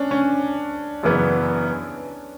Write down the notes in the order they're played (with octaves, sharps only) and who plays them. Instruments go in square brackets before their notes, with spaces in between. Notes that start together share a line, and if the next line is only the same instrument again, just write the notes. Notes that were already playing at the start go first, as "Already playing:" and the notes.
Already playing: [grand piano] C#4 D4
C#4
[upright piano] F#2 C#3 E3 B3